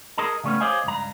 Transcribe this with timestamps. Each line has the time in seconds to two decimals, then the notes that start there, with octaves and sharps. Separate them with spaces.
0.18 G#4 A#4 D#5 A5 A#5
0.44 C#3 G3 A3 B3 C#4
0.60 G4 C5 C#5 D#5 F5 G#5
0.84 C#2 G2 A#5